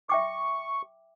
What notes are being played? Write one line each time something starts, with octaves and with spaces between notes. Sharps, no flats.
E5 G5 C#6 D6